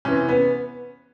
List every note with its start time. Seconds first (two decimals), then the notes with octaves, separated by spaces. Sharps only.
0.05 C3 E3 C#4
0.29 B3